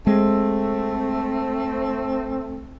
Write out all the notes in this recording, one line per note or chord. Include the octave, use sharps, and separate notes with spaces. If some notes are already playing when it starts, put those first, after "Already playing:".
G#3 A3 C4